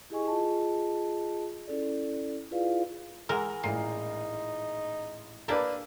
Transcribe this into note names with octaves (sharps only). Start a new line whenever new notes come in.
E4 G4 G#4 D#5 G#5 C#6
F4 G#4 D#5 A5
C#4 E4 A4 D5
E4 F4 G#4 B4 D5 F5
E3 G#3 A#4 F#5 A#5 F6
A1 A#2 G#3 D#4 C7
A#3 D4 G4 B4 D5 E6